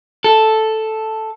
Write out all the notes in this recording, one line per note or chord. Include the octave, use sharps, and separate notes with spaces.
A4